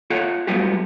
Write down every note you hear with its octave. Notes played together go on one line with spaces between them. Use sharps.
F4 A4 C#5 F#5
F#3 G3 A3 B3 F4 G4